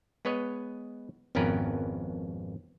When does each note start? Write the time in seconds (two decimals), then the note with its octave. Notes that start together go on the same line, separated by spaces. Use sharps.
0.25 G#3 B3 B4 C#5 D#5
1.35 G#1 F2 B3 C#4 A#4 B4